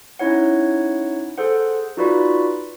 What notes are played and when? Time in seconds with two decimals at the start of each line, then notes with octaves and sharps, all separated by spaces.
0.19 C#4 D#4 E4 C#5 F#5
1.38 G#4 A4 C5 F#5
1.97 D#4 F4 F#4 B4 D5 B5